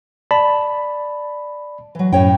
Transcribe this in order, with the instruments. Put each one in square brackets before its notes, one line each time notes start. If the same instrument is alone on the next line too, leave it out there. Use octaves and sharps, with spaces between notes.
[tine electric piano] D5 A5 B5
[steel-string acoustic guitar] E3 F#3
[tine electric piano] F#2 [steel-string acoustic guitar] A2 C#5 G5